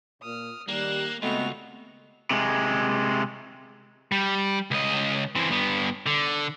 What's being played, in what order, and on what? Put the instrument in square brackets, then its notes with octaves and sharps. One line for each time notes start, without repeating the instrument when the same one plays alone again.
[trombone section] A#2 [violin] D#6 F6
[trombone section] D#3 G3 [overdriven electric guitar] A#3 [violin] F#6 E7
[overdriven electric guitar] C#2 [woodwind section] G#3 B3 C4 [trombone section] A3 [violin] F#4 F7
[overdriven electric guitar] C3 G#3
[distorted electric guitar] G3
C#2 D#5
E3 C4
G2 B3
D3